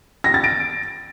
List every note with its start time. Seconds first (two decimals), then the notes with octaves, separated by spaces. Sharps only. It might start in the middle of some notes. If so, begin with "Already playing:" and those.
0.24 A#6
0.34 A6
0.44 D7